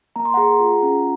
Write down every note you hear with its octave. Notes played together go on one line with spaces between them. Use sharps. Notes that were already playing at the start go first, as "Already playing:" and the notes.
A#3 A#5
C6
G#4 F#5 A#5
F4
C#4